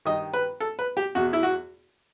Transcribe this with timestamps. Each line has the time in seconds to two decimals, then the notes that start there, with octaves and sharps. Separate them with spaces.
0.05 G2 D#3 D#5
0.33 B4
0.60 A4
0.79 B4
0.97 G4
1.15 E2 B2 F#4
1.33 E4
1.43 F#4